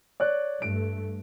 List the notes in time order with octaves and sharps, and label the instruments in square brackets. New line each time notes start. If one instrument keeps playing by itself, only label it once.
[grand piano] C#5 D5 F#6
[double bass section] G2 A3 [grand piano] D7